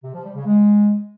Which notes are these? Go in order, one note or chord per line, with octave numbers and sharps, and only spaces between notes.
C3
F3
G3
C#3
G#3